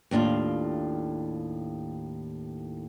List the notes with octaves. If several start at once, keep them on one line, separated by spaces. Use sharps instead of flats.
D#2 A2 D4 F4